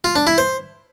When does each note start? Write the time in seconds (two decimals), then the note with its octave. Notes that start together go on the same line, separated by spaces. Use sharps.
0.04 F4
0.16 D4
0.27 E4
0.38 C5